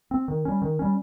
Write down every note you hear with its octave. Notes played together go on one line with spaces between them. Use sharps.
C4
D#3
G3 C#4
D#3
G3 C#4